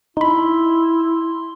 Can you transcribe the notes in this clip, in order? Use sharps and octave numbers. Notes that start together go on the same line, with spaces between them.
D#4 E4 B5 C6